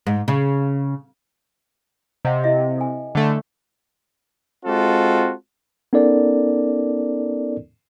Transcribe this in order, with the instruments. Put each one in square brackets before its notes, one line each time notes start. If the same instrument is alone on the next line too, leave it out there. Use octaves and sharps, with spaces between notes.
[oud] G#2
C#3
[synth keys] C3 [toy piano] D#5 F5 F#5
[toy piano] E4 D#5 E5
A4 G#5
[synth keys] D3 A3
[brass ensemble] G#3 C4 F4 F#4 A4
[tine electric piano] B3 C#4 D#4 A4 A#4 D5